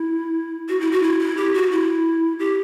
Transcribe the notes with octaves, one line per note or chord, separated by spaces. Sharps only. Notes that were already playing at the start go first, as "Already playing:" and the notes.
Already playing: E4
F#4
E4
F#4
E4
E4
G4
F#4
E4
G4